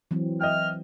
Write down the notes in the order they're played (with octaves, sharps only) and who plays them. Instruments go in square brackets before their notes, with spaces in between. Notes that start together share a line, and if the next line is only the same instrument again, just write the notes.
[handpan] E3 F#3 C4
[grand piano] D#5 E5 G5 [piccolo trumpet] F6